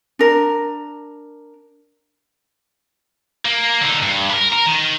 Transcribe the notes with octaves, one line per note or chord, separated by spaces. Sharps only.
D4 A#4
A#3
D3 D#4
G2
A#4 B4
A#4
D#3